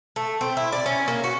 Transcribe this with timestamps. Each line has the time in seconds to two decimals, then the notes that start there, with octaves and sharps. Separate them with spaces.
0.16 A3
0.41 C4
0.57 E4
0.72 D5
0.86 C#4
1.08 A#3
1.24 F#4